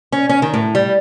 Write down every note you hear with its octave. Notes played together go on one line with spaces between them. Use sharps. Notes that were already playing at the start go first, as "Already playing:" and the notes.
C#4
C#4
D#3
A2
G3